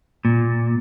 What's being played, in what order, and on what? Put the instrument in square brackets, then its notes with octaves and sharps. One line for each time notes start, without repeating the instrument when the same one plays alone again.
[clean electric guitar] A#2